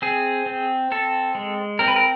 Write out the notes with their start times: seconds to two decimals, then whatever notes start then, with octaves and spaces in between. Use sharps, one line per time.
0.02 C4 G#4
0.46 C4
0.91 C4 A4
1.35 G#3
1.79 C4 A#4
1.88 B4
1.96 A#4